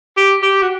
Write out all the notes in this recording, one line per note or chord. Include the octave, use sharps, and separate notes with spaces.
G4
G4
F#4